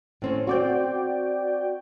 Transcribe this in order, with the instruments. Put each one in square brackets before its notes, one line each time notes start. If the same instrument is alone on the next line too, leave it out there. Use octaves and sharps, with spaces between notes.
[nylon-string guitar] A2 C4 C#4
[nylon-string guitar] C4 [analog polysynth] F#4 D5 G5